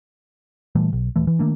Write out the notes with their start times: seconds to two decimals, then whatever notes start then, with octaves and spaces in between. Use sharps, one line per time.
0.75 A#2 E3 G3 A3
0.93 B1
1.16 D#1 E3 A3
1.27 E3
1.39 D#3 A3 A#3 D4